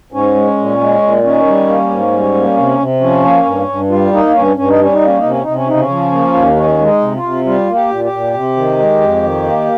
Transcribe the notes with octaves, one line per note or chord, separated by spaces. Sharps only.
G#2 C#4
G#3
A#2
G#3
A#2
D#3 C#4
G3
A#3
G#2
G3
A#3
C3
C3
F3 C#4
A#3
G2
G2
G3 F4
A#3 D#4
G2 C#4
G2 C#4
D#4
G3 C#4
D#4
A#3 C#4
D#4
C3
C#4
C3 D#4
C#4
C#3 D#4
C#4
F3
A#3
D#2
D#3 C#4
G#3
D#4
C3
F4
C3
G3 F4
A#3
G4
A#2
G4
A#2
C3
D#3
G#3
F2
D#3
A#3